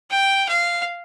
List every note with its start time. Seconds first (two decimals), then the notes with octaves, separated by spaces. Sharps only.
0.11 G5
0.49 F5